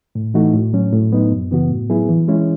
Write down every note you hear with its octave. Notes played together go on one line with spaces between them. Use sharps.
A2
E3 A3 D#4 F#4
A2
F#3 C#4
A2
F#3 B3 D#4
F#2
C#3 E3 B3 F#4
A2
F#3 B3 E4 G#4
E3
G#3 C#4 E4